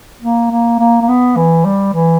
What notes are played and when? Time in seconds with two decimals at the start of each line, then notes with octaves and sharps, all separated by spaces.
0.22 A#3
0.51 A#3
0.80 A#3
1.02 A#3
1.08 B3
1.37 E3
1.65 G3
1.93 E3